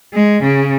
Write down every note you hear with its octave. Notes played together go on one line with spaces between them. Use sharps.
G#3
C#3